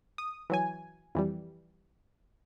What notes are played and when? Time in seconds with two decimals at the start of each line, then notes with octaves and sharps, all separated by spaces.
0.18 D#6
0.50 E3 F#3 G#5
1.15 F2 E3 G3